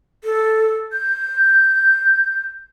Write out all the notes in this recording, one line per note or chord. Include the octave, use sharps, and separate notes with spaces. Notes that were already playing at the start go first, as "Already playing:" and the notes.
A4
G6